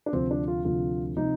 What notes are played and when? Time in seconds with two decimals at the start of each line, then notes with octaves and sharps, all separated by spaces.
0.06 D4
0.13 D2 C3 F3 C4
0.31 D4
0.48 F4
0.65 D2 C3 F3 F4
1.17 C3 F3 D#4